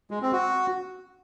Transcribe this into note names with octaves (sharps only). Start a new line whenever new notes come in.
G#3
C4
F#4